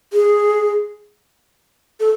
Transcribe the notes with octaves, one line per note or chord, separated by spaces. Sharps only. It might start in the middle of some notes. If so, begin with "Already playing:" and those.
G#4
A4